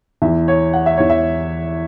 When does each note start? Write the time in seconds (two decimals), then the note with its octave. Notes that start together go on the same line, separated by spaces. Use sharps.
0.22 E2 E3 E5
0.48 C#5
0.73 F#5
0.86 E5
0.97 E2 E3 C#5
1.10 E5